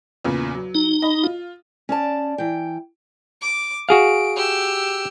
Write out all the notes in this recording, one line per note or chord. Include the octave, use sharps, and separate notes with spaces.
E2 A#2 C#3
F#3
D#4
D#5 B5
F4
C#4 D5 A5
E3 G5
D6
F#4 G#4 F5 D7
G4 E6